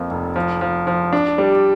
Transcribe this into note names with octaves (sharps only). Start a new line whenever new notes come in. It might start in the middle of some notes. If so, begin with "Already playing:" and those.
Already playing: F2 F3 A#3
F1
F3
F3
F3
D4
G3